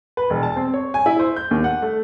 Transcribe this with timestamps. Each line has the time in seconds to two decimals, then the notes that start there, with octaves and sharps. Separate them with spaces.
0.17 B4
0.30 E1
0.43 A5
0.56 C4
0.74 C#5
0.94 G#5
1.06 E4
1.19 C5
1.36 G6
1.51 D#2
1.64 F#5
1.82 A3